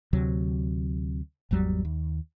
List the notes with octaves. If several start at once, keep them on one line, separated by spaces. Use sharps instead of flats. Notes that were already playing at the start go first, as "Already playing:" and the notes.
D2 C3 F#3
G#1 E2 F#3 G3
D#2